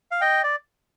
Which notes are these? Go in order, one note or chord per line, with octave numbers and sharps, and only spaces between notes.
F5
D#5 G5
D5